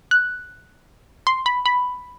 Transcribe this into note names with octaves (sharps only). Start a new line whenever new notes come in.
F#6
C6
B5
B5